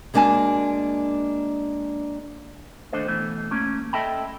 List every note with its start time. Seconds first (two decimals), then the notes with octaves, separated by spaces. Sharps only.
0.14 G#3 A#3 D4 F#4 G#5 A5
2.93 D#2 A3 D4 A4 C5 D#5
3.08 B2 E3 A3
3.51 A3 A#3 C#4
3.93 A4 D#5 E5 G5 A5 B5